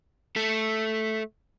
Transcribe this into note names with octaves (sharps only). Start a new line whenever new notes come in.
A3 A4